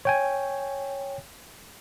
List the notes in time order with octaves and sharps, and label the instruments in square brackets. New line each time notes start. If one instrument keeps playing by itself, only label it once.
[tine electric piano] C#5 G5 G#5